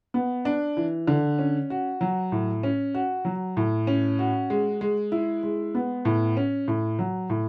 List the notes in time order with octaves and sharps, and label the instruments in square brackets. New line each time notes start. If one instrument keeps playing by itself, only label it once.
[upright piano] B3
D4
E3
D3
C#4
F#4
F#3
A2
C#4
F#4
F#3
A2
C#4
F#4
G#3
G#3
E4
G#3
B3
A2
C#4
A2
F#3
A2